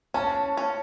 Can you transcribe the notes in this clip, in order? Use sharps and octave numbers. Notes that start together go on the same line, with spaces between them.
C#4 A5
C#4